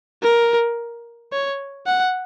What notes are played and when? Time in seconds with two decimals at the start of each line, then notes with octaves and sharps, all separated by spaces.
0.23 A#4
1.32 C#5
1.87 F#5